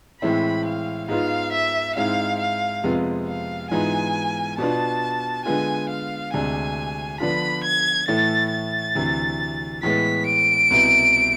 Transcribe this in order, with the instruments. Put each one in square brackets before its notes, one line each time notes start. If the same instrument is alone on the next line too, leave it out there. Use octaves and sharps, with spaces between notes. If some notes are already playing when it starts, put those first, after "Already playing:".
[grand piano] A2 E3 G#3 C4 E4 [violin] B5
[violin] F5
[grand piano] G#2 G#3 B3 F4 [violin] F5
[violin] E5
[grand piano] G#2 G#3 C4 E4 [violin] F5
[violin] F5
[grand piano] F2 C3 G#3 B3 F4
[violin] F5
[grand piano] G#2 E3 G#3 B3 F4 [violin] G#5
[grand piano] B2 B3 D4 F4 [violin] A5
[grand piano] D3 G#3 B3 F4 [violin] G#5
[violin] F5
[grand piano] D2 C3 G#3 D4 [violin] G#5
[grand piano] D3 F3 B3 D4 F4 [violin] B5
[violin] G#6
[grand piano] A2 E3 A3 E4 [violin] A6
[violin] A6
[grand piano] D2 C3 E3
[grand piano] A2 E3 G#3 B3 [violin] B6
[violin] D7
[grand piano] C2 B2 B3 E4